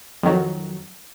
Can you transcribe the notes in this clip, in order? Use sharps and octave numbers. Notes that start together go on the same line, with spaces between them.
F2 D#3 F#3